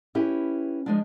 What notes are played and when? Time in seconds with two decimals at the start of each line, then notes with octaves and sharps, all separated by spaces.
0.15 C#4 E4 G4 B4
0.86 F3 G#3 D4